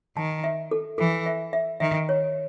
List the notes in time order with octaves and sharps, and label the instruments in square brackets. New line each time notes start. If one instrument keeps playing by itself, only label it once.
[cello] D#3 [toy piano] A5
[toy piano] E5
A4
[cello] E3 [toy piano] A4
[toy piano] E5
E5
[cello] D#3 [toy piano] E5
[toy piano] C#5